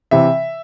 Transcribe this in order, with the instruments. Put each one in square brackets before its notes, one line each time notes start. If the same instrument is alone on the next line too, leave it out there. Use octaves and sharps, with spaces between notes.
[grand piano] C3 E3 E5